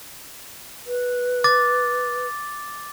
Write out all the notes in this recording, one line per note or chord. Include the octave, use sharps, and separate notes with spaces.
B4
D6 A6